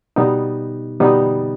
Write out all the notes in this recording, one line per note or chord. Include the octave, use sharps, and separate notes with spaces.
B2 G3 B3 D#4
B2 G3 B3 D#4